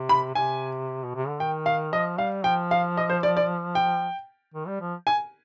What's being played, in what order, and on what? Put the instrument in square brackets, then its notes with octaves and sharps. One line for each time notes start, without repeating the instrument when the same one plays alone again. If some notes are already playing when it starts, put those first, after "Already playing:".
Already playing: [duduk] C3
[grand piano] B5
[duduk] C3 [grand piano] G#5
[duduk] B2
C3
D3
[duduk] D#3 [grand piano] G5
[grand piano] F5
[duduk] F3 [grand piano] D#5
[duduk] G3 [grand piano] F5
[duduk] F3 [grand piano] G5
[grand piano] F5
D#5
C5
D5
D5
G5
[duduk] D#3
G3
F3
[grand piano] G#5